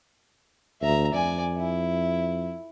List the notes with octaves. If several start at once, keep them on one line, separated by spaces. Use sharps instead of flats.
D2 E5 A#5
F2 D5 G#5
E4